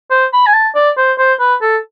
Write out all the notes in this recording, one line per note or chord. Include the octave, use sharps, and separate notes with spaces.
C5
B5
G#5
A5
D5
C5
C5
B4
A4